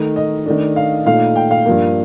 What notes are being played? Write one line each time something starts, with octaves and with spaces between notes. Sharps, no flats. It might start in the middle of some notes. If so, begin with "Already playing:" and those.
Already playing: D#3 A3 D#4
D#5
D#3 A3 D4
F5
A#2 A3 D#4 F5
G5
F5
G2 F3 A#3